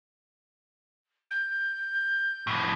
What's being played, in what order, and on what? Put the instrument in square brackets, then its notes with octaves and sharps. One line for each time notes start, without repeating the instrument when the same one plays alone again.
[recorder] G6
[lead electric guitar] F2 A2